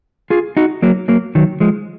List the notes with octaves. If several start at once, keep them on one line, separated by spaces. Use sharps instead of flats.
F4 G#4
D#4 F#4
F#3 A#3
F#3 A#3
D#3 F#3
F3 G#3